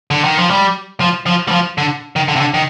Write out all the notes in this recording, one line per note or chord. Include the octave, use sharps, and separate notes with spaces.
D3
D#3
F3
G3
F3
F3
G3
F3
D3
D#3
D3
C3
D3
D#3